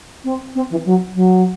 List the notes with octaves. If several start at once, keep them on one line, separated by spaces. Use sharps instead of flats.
C4
C4
E3
F#3
F#3